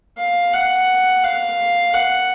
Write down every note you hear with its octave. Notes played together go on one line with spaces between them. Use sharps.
F5
F#5
F5
F#5